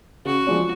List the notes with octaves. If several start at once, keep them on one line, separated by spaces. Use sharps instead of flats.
C#3 F#4
F3 G#3 B3 D4